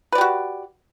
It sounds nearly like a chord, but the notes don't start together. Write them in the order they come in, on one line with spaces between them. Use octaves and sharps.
B4 D5 G4 F#4